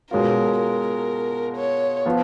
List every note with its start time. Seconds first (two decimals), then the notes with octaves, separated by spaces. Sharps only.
0.11 B2 G#3 C#4 F4 A#4
0.60 A#4
1.57 C#5
2.05 F3 B3 F4